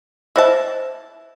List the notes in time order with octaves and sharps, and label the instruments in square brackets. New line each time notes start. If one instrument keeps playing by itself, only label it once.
[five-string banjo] E4 A5 [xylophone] C5 D#5 E6